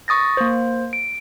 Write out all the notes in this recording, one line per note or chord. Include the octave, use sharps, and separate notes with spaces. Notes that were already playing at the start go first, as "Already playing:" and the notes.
C#6 D#6 A6 A#6
A#3 C5
D7